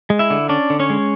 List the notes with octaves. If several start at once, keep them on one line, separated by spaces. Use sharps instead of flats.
G#3
E4 E5
D3
C#4 D4 D5
D3
C#4 C#5
G#3